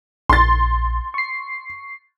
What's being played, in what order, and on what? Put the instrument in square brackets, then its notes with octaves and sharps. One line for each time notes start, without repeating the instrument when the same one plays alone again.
[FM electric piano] A#1 [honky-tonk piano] C6 A6
[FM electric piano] C#6 C7